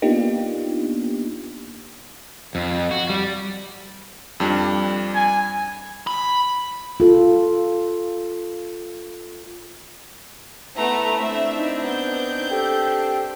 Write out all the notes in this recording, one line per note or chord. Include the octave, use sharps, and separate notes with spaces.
A#3 B3 D4 D#4 F4 G4
F2
F#4
G3
F2 G3 D4
G#5
B5
F4 A4
A3 B3 E4 A#5
A3 C4 D4 E5
D#4
B3 G6
G4 A4